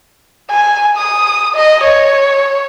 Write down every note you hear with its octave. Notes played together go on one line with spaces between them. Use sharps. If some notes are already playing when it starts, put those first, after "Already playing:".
G#5
D#6
D#5
C#5